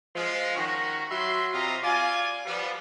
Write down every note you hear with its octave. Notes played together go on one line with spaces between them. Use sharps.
F3 G#3
D#3 C#4 F#4
F#3 F#4 E5 B5 C6
C3 C4 F4 C#5 D#5 A#5
F4 D5 G#5
F3 G3 B3